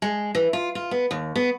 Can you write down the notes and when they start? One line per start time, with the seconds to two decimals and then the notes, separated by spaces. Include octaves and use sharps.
0.02 G#3
0.35 E3
0.53 F4
0.75 F4
0.91 B3
1.11 D#2
1.36 B3